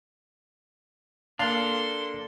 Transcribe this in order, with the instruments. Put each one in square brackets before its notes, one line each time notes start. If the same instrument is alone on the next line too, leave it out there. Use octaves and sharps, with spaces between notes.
[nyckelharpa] A#3 A4 [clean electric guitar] D4 [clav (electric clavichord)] F5 [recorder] C6